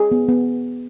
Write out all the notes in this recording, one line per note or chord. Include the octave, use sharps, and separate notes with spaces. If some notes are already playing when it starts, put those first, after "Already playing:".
Already playing: G#4
B3
B3